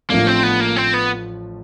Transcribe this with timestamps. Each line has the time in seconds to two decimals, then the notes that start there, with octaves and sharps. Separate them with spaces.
0.10 A1 A2 F3 A3 A#3 D4
0.27 C4
0.43 B3
0.60 A#3
0.77 C4
0.94 B3